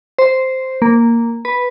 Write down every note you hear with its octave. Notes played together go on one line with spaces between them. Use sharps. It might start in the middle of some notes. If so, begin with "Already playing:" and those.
C5
A#3
B4